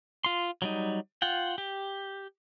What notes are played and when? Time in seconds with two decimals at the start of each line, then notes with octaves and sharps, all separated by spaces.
0.24 F4 C6
0.62 F#3 G3 D#4
1.22 F4 F#5 G5
1.58 G4